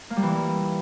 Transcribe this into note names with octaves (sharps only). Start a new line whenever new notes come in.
A#3
G3
E3